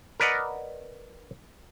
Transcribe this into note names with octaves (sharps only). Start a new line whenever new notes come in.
A#4 B4 D5 D#5 F#5